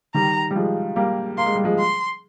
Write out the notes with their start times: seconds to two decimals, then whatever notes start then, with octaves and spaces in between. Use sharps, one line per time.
0.14 D#3 G3 A#5
0.51 G3
0.56 F3 G#3
0.96 G3 A#3
1.38 A#3 C6
1.46 G#3
1.55 G3
1.64 F3 G#3
1.79 C6